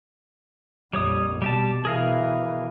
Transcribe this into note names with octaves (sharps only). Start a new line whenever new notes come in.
A#1 F2 G3 C#5 D#6
B2 G3 G4 A5
B2 E3 G#4 A#4 F5